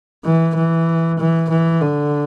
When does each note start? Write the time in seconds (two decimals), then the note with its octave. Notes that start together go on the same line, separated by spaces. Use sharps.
0.24 E3
0.55 E3
1.18 E3
1.49 E3
1.81 D3